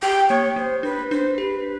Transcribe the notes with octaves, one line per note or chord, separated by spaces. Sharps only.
G4 G5
A#3 C#5
A#3 C5
D4 B4
D4 C5
G4 B4